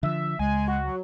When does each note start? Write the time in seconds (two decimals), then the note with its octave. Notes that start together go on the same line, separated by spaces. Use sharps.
0.03 D3 F3 E5
0.39 C#2 G#3 G#5
0.68 F#4
0.84 F#3